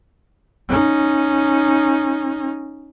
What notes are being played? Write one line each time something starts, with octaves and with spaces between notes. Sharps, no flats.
C#4 D#4